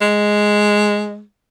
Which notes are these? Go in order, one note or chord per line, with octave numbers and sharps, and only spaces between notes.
G#3